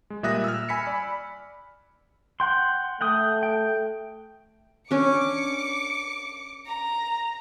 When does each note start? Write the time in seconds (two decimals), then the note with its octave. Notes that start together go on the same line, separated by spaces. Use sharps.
0.10 G#3
0.23 A#2 G3 E5 D#6 F#6 A#6
0.44 E6 F6
0.69 G#5 B5 B6 C#7
0.87 D5 B5
2.40 F#5 G5 C6
3.01 A3 F#5 G5 D#6
3.43 G5
4.91 C#4 D4 D6 C#7
6.66 A#5